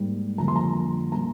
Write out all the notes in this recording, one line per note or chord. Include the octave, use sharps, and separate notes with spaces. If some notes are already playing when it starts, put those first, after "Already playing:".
Already playing: G#2 G3 A#3
F2 D3 G3 A#3 A#5
C6
A#5
A#2 G3 A#3 A#5